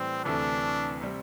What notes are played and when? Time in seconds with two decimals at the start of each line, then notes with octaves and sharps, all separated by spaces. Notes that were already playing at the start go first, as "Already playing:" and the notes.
Already playing: A2 E3 G3 C4
0.24 D2 C3 E3 A3 D4
1.01 C3 G3 C4